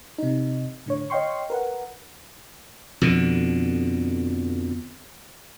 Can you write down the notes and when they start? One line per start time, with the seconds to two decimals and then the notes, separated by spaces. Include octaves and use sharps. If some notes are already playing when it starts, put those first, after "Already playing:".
0.18 C3 D#4
0.86 A2 D3 C#5
1.10 C#5 D#5 F5 G5 C6 C#6
1.50 A#4 B4 F#5
3.01 F2 B2 D3